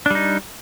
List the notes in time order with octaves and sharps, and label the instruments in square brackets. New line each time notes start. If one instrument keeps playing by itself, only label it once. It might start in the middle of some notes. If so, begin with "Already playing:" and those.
[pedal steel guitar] D4
G3
D#4